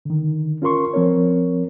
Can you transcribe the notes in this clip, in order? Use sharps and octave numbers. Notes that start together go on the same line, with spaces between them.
D3 D#3
C#4 F4 A#4 C6 C#6
F3 C4 A#4 C#5